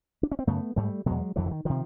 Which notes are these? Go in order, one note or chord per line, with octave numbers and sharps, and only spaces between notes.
D4
C#4
C4
F#2 C#3 A3 B3
G#2 G3 A3
E2 B2 F#3 G#3
F2 D3 E3 F#3
D3
D#3
C3 D#3 F3